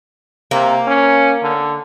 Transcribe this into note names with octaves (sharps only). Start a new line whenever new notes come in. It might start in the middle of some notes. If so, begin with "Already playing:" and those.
C3 A#3
C#4
D3